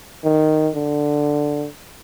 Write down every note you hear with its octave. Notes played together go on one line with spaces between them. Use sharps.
D#3
D3